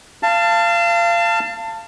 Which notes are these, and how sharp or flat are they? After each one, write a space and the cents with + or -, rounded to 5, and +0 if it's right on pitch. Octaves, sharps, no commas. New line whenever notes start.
F5 -25 A5 +20